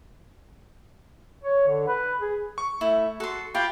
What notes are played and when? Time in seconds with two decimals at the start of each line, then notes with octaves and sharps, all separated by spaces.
1.44 C#5
1.68 D3
1.88 B4
2.21 G#4
2.58 C#6
2.81 A3 E4
3.20 F#4 A4 C6
3.55 F4 G4 B4 G5